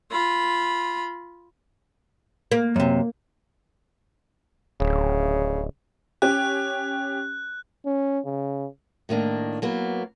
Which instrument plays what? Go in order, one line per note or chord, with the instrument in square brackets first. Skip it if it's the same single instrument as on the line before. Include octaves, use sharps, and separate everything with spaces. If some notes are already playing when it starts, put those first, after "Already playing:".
[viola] F4 B5
[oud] A#3
[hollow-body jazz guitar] F#2 C3
[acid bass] D1 [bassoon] C#3
[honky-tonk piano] C#4 G4 [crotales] F#6
[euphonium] C#4
C#3
[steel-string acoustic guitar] A2 D#3 A#3 D4
F#3 A#3 B3